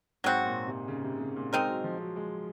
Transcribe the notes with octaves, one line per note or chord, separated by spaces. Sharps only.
G#2 F#3 C4 F#4
A#2
C3
C#3
C3
C3
A#2
G#3 C4 D#4 A#4
F#3
F3
F#3
G#3